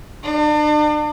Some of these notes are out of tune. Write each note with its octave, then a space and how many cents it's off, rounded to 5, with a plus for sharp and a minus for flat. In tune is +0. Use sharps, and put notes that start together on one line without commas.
D4 +40